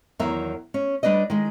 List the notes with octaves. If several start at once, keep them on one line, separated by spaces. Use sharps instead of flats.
E2 D#3 F#3 A#4 E5
C#4
G3 D4 B4 D5 D#5
D#3 G#3